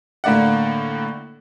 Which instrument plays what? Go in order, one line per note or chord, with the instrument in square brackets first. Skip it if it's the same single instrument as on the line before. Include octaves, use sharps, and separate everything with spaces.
[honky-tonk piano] A2 D3 A#3 D5 F#5